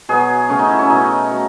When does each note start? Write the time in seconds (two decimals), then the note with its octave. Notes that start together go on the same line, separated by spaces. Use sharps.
0.09 B2 F#3 B3 G#4
0.49 C#3 F#3 A3 C#4
0.59 D#4
0.69 E4
0.79 C#4
0.90 B2 A3 D#4
1.29 F#3 A3